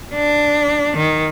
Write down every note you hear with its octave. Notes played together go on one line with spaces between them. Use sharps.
D4
D#3